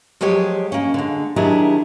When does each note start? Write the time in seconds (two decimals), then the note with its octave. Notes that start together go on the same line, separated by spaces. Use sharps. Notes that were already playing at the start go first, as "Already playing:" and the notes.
0.21 F3 F#3 G#3 G4 C#5
0.72 A#3 C#4
0.94 D3 G#3
1.36 D#3 F#3 D4 E4 G4 G#4